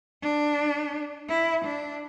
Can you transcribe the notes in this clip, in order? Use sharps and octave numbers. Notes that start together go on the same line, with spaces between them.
D4
E4
D4